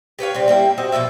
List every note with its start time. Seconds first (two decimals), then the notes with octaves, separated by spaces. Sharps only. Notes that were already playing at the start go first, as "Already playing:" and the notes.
0.19 G4 B4 C#5 F5
0.34 C3 G3 C4
0.48 G3 A#3 E4 G5
0.78 C4 F#4 D#5
0.92 B2 E3 F3 E5